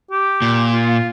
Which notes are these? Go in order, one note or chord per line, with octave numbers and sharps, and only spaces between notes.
G4
A#2
F4